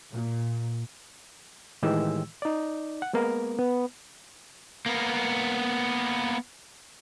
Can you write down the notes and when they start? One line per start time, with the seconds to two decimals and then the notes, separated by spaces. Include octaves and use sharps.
0.12 A#2
1.82 A2 D#3 E3 G#3 G4 E6
2.42 D#4 D5
3.02 F#5
3.14 G#3 A#3 B3 A#4
3.59 B3
4.86 A#3 B3